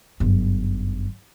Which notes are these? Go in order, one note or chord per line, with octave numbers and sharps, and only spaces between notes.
G1 F#2